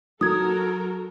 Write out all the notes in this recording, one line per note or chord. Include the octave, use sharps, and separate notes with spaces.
F#3 F#4 A4 A#4 D#6 G#6